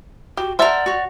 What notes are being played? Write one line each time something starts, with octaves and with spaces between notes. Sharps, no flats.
F#4 G4
A#4 C5 D5 E5 F#5 A5
F#4 C#5